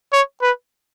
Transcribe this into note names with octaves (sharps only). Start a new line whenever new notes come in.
C#5
B4